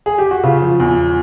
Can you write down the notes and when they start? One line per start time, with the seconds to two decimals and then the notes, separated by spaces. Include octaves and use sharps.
0.06 G#4
0.18 G4
0.31 F#4
0.43 C#3 F4
0.62 F3
0.80 E2